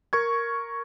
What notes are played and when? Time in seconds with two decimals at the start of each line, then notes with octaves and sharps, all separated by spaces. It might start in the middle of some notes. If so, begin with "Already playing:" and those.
0.13 A#4 C#6 G#6